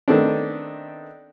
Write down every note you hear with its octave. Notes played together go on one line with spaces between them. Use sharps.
D#3 A3 B3 C4 D4